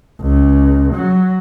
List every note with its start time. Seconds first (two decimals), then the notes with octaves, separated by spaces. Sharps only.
0.21 C#2
0.94 F#3